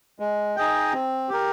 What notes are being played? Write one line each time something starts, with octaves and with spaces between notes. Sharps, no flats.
G#3
D#4 G#4 D#5 G5
C4
G4 A#4